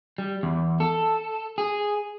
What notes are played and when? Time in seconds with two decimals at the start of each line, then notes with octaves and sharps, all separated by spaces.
0.18 G3
0.43 E2
0.80 A4
1.58 G#4